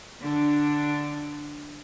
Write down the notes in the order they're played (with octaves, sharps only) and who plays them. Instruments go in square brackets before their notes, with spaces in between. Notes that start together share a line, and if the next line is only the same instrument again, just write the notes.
[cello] D3 D4